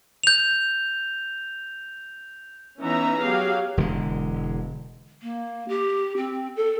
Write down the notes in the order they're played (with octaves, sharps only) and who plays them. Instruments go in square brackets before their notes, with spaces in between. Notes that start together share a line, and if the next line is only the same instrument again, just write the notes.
[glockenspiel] G6 F7
[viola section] E3 B3 C#4 D#4 E5 A#5
F#3 G4 G#4 F5
[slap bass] E1 D3 G#3
[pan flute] A#3
G4
C4
A4